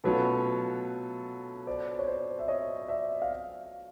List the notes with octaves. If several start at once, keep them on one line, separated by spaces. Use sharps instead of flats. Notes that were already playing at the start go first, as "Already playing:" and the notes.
B2 F#3 A3 C#4 F4 A4 B4
C5 D5
C#5
C5 D5
E5
C#5 D#5
D5 E5
F5